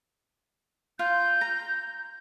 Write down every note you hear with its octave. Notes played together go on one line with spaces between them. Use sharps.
F4 G6
A#5